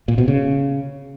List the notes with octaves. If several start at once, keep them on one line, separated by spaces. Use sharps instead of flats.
A#2
B2
C#3